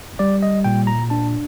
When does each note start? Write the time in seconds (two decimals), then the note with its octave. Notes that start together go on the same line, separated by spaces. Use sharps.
0.19 G3 D5
0.43 D#5
0.64 A#2 G5
0.87 A#5
1.10 D4 A5